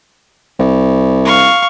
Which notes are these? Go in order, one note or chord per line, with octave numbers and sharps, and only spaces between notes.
C2
F5 C#6